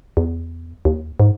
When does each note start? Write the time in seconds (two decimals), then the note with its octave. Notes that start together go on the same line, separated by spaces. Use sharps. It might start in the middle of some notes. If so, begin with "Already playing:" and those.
0.17 E2
0.85 D#2
1.20 G#2